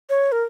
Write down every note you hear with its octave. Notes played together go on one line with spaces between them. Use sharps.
C#5
A#4